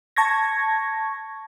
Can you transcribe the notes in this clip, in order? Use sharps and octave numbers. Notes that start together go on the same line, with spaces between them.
A5 C#6 G#6 A#6